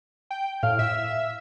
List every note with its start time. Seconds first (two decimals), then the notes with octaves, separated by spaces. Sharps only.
0.31 G5
0.63 A2 F5
0.79 E5